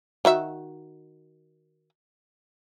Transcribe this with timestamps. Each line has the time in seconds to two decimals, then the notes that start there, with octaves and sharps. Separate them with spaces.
0.25 D#3 F#4 E5